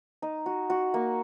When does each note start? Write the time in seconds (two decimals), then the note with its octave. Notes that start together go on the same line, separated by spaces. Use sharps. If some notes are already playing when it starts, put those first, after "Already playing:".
0.22 D#4
0.46 F#4
0.70 F#4
0.94 A#3